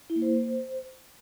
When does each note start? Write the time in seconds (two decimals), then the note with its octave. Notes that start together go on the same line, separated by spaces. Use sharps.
0.10 E4
0.16 A#3
0.22 C5
0.28 A#3
0.35 C5